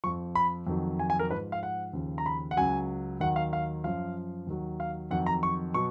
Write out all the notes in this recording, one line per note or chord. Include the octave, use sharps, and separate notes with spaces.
F2 F3 C#6
B5
F2 D#3 F#3
G#5
G#5
A#4
G#2 F3 B4
F5
F#5
D#2 C#3 F3
A#5
B5
F#5
C#2 C#3 F#3 G#5
D#2 D#3 F#3 F#5
F5
F5
F#2 F3 F5
D#2 D#3 F#3
F5
F2 D#3 F#3 F#5
A#5
C#6
B2 F#3 C#6